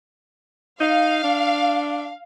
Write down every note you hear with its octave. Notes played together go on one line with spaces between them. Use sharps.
D#4 F5
D4